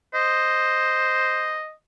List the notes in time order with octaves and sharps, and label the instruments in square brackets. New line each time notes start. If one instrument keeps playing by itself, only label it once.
[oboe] C5 [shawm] D#5